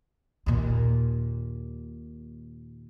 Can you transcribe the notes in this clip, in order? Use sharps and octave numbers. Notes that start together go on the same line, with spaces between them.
D#2 A#2